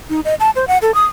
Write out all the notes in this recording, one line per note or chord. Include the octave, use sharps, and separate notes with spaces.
D#4
D#5
A5
C5
F#5
A4
D#6